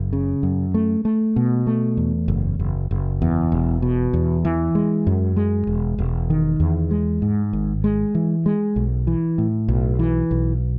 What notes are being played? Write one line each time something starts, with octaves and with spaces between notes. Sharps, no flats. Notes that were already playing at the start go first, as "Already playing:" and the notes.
Already playing: F#1
C#3
F#2
A3
A3
B2
A3
E2
F#1
F#1
F#1
E2
E1
B2
E2
E3
G#3
F#2
G#3
E1
E1
D#3
E2
G#3
G#2
G#1
G#3
E3
G#3
B1
E3
A2
B1
E3
B1